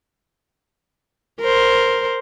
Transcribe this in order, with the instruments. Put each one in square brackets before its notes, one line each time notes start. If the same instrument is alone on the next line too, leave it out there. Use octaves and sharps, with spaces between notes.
[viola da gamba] A#4 C5